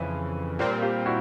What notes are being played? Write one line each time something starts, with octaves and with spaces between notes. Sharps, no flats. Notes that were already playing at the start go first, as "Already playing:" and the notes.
Already playing: F2 C#3 E3 B4
A#2 G3 C4 A#4 C5
F4 G4
E4 F#4